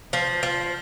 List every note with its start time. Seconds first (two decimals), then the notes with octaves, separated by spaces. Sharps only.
0.13 F3
0.43 F3